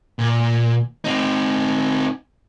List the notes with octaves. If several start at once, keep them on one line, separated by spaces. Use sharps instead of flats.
A#2
C4 D#4